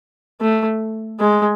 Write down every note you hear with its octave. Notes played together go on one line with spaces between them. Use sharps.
A3
G#3